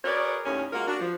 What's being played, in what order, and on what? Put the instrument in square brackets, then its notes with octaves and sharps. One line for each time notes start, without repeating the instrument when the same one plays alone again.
[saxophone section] F#4 G#4 A#4 B4 C#5 D5
D#2 A2 C#4
G#3 A#3 F4 F#4 A#4
D4 F#4
F3